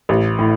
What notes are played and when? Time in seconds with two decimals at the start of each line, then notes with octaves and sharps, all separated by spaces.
0.09 A1
0.39 A2